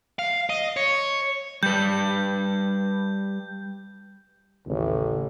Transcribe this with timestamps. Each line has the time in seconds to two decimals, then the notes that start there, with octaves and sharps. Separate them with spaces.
0.19 F5
0.49 D#5
0.77 C#5
1.63 G3 B4 G6
4.67 A1 D#2 C#3